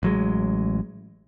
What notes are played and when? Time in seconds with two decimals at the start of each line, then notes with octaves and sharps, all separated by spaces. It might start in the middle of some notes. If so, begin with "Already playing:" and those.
0.03 A1 F#3 G#3